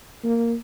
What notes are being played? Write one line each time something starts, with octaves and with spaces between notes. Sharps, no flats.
A#3